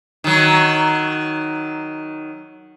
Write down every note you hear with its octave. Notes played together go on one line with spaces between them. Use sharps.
D#3 F#3